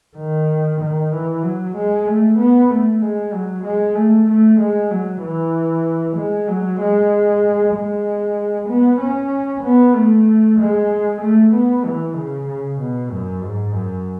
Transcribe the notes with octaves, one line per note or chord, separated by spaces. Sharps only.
D#3
D#3
E3
F#3
G#3
A3
B3
A3
G#3
F#3
G#3
A3
A3
G#3
F#3
E3
G#3
F#3
G#3
G#3
B3
C#4
B3
A3
G#3
A3
B3
E3
C#3
C#3
B2
F#2
G#2
F#2